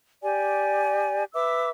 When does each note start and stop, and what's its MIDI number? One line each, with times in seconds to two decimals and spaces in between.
0.22 1.24 67
0.22 1.24 74
0.22 1.24 80
1.34 1.69 71
1.34 1.69 76
1.34 1.69 86
1.34 1.69 88